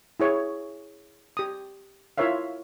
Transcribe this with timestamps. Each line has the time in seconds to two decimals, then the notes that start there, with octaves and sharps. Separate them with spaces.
0.20 E4 G#4 C#5
1.37 G4 D#6
2.18 E4 F4 A#4 C#5 E5 F5